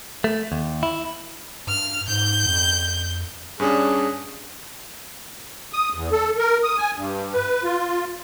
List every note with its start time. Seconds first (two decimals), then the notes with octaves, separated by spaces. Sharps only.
0.24 A3
0.52 D#2
0.83 E4
1.67 G2 F6
2.08 G#2 G6
2.46 F2
3.60 G2 C#4 D4 G#4
5.73 D#6
5.94 E2
6.12 A4
6.38 A#4
6.63 D#6
6.78 G#5
6.96 G2
7.34 B4
7.64 F4